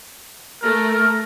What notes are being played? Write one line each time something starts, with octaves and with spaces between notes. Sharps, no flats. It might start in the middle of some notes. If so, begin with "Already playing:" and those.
A3 A#4